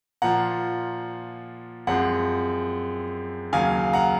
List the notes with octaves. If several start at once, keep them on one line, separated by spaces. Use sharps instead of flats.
A#2 F3 A#3 F#5 A#5
F#2 F3 G#3 C4 F#5
D#2 C#3 F#3 F5 G#5
F#5 A#5